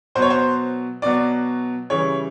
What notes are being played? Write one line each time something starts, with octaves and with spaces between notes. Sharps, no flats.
B2 F#3 C5
C#5
C5
B2 F#3 D5
C#3 E3 G3 C#5